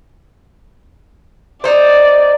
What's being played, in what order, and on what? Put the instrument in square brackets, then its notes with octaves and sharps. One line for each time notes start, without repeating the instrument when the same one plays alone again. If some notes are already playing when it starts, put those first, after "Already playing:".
[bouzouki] D#4 C5 [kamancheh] D5